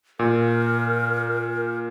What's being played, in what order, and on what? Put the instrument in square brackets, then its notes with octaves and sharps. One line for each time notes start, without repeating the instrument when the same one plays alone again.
[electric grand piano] A#2 [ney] A#4